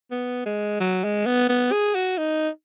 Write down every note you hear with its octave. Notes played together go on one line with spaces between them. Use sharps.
B3
G#3
F#3
G#3
B3
B3
G#4
F#4
D#4